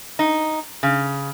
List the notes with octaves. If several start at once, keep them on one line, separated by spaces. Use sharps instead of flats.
D#4
C#3